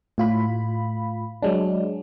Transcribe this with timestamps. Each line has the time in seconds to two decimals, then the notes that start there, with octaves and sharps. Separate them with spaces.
0.18 A2 F4 B5
1.42 F#3 G#3 D4